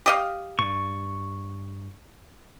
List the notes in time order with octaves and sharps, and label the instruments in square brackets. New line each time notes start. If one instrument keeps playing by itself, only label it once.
[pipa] G4 D#5 F5
[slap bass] G2 [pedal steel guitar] C#6